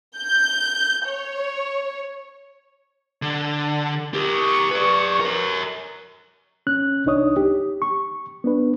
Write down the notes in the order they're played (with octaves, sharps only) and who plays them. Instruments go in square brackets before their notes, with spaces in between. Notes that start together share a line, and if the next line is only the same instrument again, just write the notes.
[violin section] G6
C#5
[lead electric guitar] D3
G4 A#4
[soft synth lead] C#6
[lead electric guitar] B4 D5
A#4 C#5
[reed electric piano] C#4 F#6
C2 D4 D#4 C#5 D#6
G4
C#6
B3 D4 B4